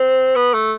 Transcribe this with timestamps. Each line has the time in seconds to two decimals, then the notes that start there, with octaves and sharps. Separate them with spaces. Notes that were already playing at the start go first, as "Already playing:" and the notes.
Already playing: C4
0.36 B3
0.54 A3